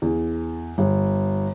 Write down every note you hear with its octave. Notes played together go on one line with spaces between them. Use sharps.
E2
G1